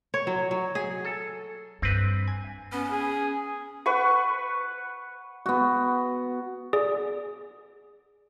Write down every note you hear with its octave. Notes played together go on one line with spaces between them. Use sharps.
C#5
F#3
F#3
G#4
A4
G2 C4 B4
G#5
B3 C#4
G#4
B4 F#5 C#6
B3 F#4
G#4 D5